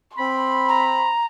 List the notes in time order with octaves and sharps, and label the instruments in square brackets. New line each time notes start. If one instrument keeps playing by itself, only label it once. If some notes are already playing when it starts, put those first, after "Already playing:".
[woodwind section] C4 B5 [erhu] C6
[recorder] A#5